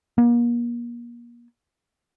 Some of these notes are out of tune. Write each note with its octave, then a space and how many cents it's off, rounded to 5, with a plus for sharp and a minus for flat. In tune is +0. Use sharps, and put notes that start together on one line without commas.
A#3 +35